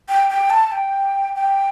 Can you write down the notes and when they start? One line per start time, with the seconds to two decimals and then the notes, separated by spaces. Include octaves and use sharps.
0.09 G5
0.30 G5
0.50 A5
0.72 G5
1.35 G5